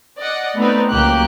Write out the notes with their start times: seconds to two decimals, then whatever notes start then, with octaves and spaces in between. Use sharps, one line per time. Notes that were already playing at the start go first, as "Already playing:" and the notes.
0.19 D5 D#5 F#5
0.57 A3 B3 C4 D#4 B4 D5
0.91 C#2 F#3 A#3 G4 F#6